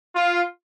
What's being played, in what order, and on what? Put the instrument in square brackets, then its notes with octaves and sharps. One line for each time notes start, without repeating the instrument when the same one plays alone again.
[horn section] F4